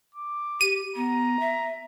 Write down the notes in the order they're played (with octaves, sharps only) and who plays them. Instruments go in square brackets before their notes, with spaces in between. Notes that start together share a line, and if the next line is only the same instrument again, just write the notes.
[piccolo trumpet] D6
[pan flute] G4 [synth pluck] D#7
[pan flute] B3 [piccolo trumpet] A#5
[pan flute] E5